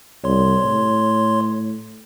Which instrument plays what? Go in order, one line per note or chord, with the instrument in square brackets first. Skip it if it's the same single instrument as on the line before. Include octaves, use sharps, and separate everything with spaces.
[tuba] C2 [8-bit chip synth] C#5 C6
[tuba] A2